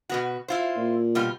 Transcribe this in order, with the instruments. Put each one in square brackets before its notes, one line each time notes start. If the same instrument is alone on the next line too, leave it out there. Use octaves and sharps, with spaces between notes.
[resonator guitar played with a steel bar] B2 B3 F#4
E4 F4 C5
[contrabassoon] A#2
[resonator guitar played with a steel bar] B2 G3 F4